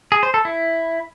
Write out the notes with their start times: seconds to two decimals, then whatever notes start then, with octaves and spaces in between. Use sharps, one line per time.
0.12 G#4
0.23 C5
0.34 A4
0.45 E4